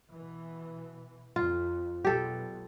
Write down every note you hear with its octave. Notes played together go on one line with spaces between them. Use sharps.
B2 E3
F2 F4
B1 B2 G#3 G4 A4